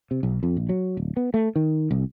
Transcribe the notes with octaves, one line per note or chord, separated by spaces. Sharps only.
C3
B1
F2
A#1
F#3
D1
B3
A3
D#3
C2